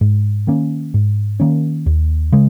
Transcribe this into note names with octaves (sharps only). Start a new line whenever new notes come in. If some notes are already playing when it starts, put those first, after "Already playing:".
G#2
D#3 A#3 C#4
G#2
D#3 A#3 C#4
D#2
C#3 G#3